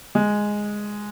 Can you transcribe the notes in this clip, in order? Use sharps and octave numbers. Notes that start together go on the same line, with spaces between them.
G#3